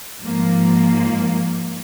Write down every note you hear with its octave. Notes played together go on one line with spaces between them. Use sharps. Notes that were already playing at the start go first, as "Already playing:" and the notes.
G#2 F3 A#3